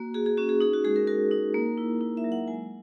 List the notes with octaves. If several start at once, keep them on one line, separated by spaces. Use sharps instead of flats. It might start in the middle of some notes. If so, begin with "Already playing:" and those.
Already playing: A#3 F#4
F#4 G#4
G#4
C#4 F#4
G#4
D#4 G#4
F#4
G#3 G#4
A#4
F#4 A#4
D#4
A#3
E4
E4
E5
F#3
F#5
G#3 G#5